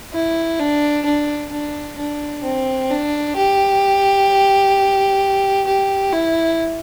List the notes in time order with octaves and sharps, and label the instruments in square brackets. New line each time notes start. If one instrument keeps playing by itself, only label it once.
[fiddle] E4
D4
D4
D4
D4
C4
D4
G4
G4
E4